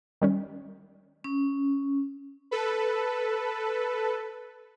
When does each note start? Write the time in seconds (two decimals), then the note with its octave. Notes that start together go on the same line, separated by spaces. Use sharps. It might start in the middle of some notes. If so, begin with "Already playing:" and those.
0.22 D#3 G3 C#4
1.24 C#4
2.51 A4 B4